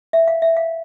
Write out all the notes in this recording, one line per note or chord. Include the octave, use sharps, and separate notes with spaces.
E5
F5
E5
F5